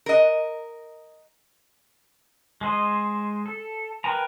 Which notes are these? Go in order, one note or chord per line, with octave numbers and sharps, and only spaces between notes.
A#4 D#5
G#3 G#4 C5 D#5
A4
A#4 B4 G5 G#5 A#5